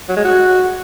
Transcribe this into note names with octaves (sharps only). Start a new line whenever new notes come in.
F#3
G#3
F#4